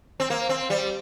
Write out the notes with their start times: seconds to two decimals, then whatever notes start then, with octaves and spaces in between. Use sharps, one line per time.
0.20 C4
0.30 A#3
0.49 C4
0.70 G3